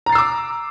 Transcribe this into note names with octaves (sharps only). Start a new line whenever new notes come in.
A#5 D6 E6 A6 C7